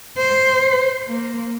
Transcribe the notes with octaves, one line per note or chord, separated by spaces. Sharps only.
C5
A#3